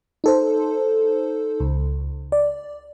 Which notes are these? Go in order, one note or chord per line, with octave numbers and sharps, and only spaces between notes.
D#4 A4 C5
C#2
D5